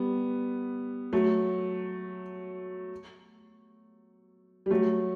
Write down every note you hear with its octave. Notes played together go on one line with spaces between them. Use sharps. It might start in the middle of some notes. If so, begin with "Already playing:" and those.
Already playing: G3 B3
F#3 A3
G3
F#3 A3